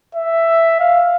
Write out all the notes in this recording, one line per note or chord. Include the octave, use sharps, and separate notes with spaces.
E5
F5